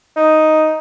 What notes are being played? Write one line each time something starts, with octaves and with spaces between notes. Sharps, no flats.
D#4